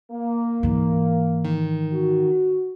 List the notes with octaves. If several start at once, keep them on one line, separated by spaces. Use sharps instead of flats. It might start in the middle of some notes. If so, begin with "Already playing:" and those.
A#3
G#2 E3
D#3
F#4